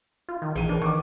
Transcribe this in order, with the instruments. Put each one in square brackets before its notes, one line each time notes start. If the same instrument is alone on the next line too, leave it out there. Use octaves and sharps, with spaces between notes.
[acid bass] F4
D#3
[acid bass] A#1 [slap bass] E3 [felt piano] G#4 D#7
[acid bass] D4 [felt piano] A#4 B4
[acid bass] D#3 [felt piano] C#6 D6